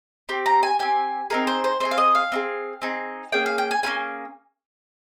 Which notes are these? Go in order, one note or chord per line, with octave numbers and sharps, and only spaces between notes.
C4 G4
A#5
G#5
C4 G4 G#5
C4 D#4 G#4 A#4
C5
C5
C4 D#4 G#4 C5
F5
D#5
F5
C4 D#4 G#4
C4 D#4 G#4
A#3 C#4 G#4 G5
F5
G5
G#5
A#3 C#4 F4 G#4 G#5